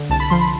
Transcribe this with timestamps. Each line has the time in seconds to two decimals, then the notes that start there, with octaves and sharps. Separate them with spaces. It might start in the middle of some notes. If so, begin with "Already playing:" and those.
Already playing: D3
0.10 C2 A5
0.20 B5
0.30 F3 C6
0.40 B5